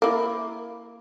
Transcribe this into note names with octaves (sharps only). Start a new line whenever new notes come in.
A#3 E4